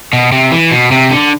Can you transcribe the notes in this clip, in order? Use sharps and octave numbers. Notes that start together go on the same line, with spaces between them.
B2
C3
E3
B2
C3
D3